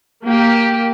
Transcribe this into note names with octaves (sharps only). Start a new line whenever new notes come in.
A#3 G4